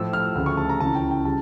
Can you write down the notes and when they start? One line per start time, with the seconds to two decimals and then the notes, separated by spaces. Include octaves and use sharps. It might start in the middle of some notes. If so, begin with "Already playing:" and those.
Already playing: A2 F3 E6
0.13 F6
0.35 D2 C#3 F3
0.46 C#6
0.57 A5
0.69 A#5
0.80 C#2 C#3 E3 A5
0.95 G5
1.11 G5
1.25 C#3 G3 A5